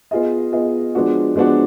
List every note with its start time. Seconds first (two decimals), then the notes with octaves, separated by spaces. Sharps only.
0.11 B3 F4 G#4 D#5
0.53 B3 F4 G#4 D#5
0.95 F3 G#3 B3 D4 F#4
1.36 F3 G#3 B3 D4 F#4